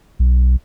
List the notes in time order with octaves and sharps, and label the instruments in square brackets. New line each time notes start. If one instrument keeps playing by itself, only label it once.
[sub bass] B1